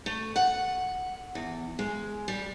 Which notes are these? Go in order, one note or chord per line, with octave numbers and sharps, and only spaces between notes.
A3
F#5
E2
G#3
G3